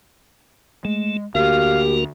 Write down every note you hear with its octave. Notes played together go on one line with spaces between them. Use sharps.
G#3 A3
D2 A#3 F#4 G4 A#4 F5